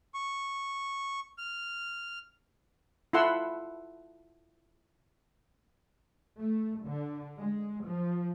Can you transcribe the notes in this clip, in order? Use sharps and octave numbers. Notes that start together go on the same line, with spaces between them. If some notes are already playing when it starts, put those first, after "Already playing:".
C#6
F6
E4 F4 A4 F#5 C6 E6
A3
D3
G#3
F3